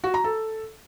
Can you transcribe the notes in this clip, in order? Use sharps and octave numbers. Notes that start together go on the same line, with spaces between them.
F#4
A#5
A4